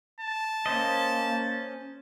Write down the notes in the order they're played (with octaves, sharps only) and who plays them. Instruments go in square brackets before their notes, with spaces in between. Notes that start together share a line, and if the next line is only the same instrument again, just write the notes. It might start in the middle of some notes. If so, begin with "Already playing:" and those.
[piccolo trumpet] A5
[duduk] A#3 [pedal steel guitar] C#4 C5 D#5